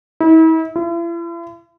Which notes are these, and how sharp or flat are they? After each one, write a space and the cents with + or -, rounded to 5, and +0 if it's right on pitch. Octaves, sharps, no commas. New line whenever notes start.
E4 -40
E4 +45